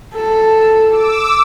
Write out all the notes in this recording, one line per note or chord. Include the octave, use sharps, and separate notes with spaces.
A4
D6 E6